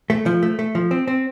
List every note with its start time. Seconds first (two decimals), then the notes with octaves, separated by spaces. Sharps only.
0.10 A3
0.26 F3
0.43 A3
0.59 A3
0.75 F3
0.91 C4
1.07 C4